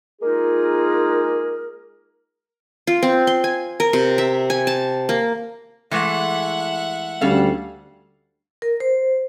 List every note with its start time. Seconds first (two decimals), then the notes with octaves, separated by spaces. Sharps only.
0.22 G#3 A#3 D#4 F4 G#4 A#4
2.87 F4
3.03 C4
3.27 C6
3.44 G#5
3.80 A#4
3.93 C3
4.18 E5
4.50 G#5
4.67 A5
5.09 A#3
5.91 E3 G#3 A3 E5 F#5
7.21 D2 G3 C#4 A4 F5
8.62 A#4
8.80 C5